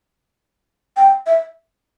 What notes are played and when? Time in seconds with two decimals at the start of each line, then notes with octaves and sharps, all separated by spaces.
0.97 G5
1.27 E5